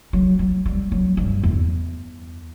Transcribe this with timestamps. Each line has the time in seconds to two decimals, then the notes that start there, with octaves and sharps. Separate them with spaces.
0.13 F#3
0.39 F#3
0.66 G3
0.92 F#3
1.17 G2
1.43 E2